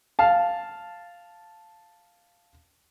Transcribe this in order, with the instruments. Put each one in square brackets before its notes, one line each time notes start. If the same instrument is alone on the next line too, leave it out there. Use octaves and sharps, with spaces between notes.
[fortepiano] F5 A5